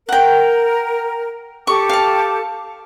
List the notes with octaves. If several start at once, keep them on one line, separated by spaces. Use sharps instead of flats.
A#4 F#5 G5
G4 A4 C#6 D6
F5 A5